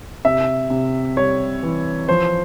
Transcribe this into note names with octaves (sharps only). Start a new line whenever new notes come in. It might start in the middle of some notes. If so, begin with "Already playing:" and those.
C3 E5
C3
G3 C#5
E3
F3 C5